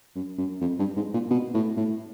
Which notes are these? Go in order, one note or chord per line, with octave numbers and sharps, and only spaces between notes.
F#2
F#2
F2
G2
G#2
A#2
B2
A2
A2